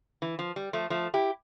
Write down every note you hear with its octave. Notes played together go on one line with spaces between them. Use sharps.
E3
F3
G3
F3 A3
F3 A3
E4 G4